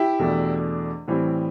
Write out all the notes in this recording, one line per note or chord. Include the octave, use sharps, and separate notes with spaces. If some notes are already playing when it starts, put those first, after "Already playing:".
Already playing: E4 G4
E2 B2 A3 D4
A2 E3 G3 C4